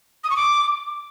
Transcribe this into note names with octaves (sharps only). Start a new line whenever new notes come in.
D#6
C#6
D6